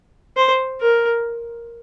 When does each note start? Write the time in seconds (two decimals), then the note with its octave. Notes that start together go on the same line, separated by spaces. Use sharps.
0.37 C5
0.81 A#4